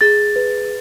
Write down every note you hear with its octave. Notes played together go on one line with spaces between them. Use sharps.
G#4 A6
B4